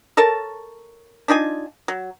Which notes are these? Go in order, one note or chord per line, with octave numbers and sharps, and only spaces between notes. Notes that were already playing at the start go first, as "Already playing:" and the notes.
A4 A#4 C#5 A5
D4 D#4 F4 G#5
F#3